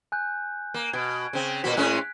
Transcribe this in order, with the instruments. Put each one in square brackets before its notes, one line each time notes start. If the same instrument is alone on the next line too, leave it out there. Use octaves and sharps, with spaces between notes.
[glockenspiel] G#5 F#6 G6
[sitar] A#3
[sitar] B2 [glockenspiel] G#6 D7
[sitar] C#3 C4
[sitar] A#2 A#3 F#4 [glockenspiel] B6
[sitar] A2 G#3 C#4 [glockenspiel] F#6